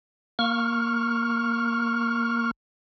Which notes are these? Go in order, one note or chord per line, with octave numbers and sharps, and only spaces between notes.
A#3 C#6 F6